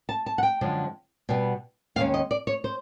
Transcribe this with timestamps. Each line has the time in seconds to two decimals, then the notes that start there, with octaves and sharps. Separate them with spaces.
0.09 A5
0.26 A5
0.38 F#5
0.43 G5
0.61 F#2 D3 F3 G#3
1.29 B2 G3 B3
1.96 D#2 D#3 G#3 C#4 F5
2.14 D#5
2.31 D5
2.47 C#5
2.64 C5